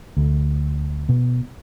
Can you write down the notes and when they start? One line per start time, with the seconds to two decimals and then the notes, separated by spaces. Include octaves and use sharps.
0.17 D2
1.09 B2